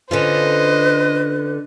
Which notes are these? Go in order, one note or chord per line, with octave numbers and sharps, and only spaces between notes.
D3 C#4 F4 B4 C5 D#5